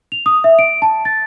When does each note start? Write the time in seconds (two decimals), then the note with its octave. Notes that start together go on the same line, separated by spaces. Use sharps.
0.12 F7
0.26 D#6
0.44 E5
0.59 D7
0.82 A5
1.05 A6